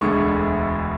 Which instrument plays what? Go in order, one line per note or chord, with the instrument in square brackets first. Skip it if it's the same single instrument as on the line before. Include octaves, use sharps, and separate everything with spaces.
[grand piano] E1 D2 D3 G#3 C#6